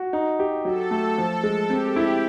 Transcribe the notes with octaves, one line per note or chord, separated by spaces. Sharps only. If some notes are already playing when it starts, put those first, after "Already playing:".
Already playing: F#4
D#4
G4
F#3 A4
A3
F3
G#3
C4 G4
E4